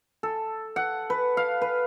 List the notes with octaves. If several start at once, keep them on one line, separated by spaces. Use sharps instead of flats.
A4
F#5
B4
F5
B4